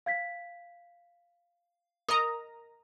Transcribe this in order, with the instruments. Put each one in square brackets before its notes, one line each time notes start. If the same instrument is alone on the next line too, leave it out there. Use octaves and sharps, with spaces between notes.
[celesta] F5 G#6 B6
[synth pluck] A#4 D#5 A#5 [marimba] D#6